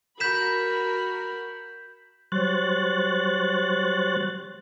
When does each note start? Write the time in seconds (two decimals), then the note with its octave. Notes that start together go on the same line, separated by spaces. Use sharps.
0.20 F#4 A#4 B5 G6 B6 E7
2.32 F#3 G3 C5 C#5 F#6 A6